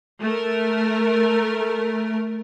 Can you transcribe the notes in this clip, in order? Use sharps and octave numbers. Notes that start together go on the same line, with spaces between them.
A3 A#4